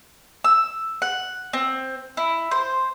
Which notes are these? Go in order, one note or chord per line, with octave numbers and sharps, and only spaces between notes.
E6
F#5
C4
E4
C5